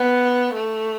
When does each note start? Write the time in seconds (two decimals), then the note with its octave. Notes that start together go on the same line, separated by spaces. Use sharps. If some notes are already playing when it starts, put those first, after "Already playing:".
Already playing: B3
0.54 A3